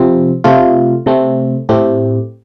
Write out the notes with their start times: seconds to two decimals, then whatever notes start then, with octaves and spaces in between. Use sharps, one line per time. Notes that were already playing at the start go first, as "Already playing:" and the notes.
Already playing: C3 F3 C4
0.44 C3 A3 F4
1.06 C3 A3 C4
1.69 A2 A3 C4 G4